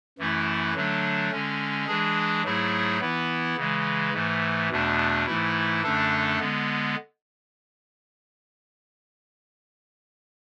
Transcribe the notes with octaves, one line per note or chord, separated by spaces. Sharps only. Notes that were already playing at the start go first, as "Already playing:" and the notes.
F#2 E3 A3 E4
D3 F#3 A3 D4
D3 G#3 C#4
E3 G#3 D4 G#4
G#2 F#3 A3 E4 G#4
E3 B3 E4
C#3 E3 G#3
G#2 E3 A3
E2 B2 A3 D4
G#2 E3 A3 E4
F#2 D3 A3 D4 A4
D3 G#3 B3